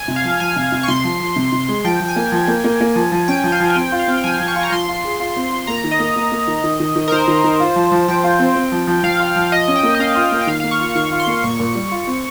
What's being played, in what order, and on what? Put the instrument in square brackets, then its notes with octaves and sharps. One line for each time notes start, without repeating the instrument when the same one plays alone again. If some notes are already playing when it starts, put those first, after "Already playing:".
Already playing: [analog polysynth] G#5
[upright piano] C3
[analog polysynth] F5
[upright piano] F3
[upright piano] F3 [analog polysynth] G#5
[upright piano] C3
C3
[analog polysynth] C#6
[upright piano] C3 [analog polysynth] C6
[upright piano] F3
F3
C3
C3
G#3
[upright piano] F3 [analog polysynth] G5
[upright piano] F3
[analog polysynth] G#5
[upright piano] A#3
F3
A#3
A#3
A#3
F3
F3
[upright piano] C#4 [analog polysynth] G5
[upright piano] F3
[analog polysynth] F5
[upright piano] F3
[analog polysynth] G#5
[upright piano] C4 [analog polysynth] G5
[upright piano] F4
[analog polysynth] F5
[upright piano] C4
[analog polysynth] G5
[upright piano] F3 [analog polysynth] G#5
[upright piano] F3
[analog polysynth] C#6
[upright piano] F4
[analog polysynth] A#5
[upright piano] F3 [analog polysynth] C6
[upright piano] F4
G#4
F4
C4
F4
[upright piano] A#3 [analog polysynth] A#5
[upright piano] D#3
[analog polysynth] D#5
[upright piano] A#3
A#3
A#3
D#3
D#3
D#3
D#3
[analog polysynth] A#4
[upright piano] D#3 [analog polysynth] C5
[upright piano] D#3
D#3
F4
F3
F3
[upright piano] F3 [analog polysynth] G5
[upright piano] F4
C4
C4
F3
F3
[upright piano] F3 [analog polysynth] F5
[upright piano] F4
F3
[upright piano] F4 [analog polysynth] D#5
[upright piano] C#4
[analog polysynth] G5
[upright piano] A#3
[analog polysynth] D#5
[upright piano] C#4 [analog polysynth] F5
[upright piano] F4
A#3
[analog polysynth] G5
[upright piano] D#3 [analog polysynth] F5
[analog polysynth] F5
[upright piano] A#3
[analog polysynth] C#6
[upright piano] F4
[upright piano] D#3 [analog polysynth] C#6
[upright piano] F4
[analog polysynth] C6
[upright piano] A#3
[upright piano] A#2 [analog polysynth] C#6
[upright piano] A#2
G3
F4
C4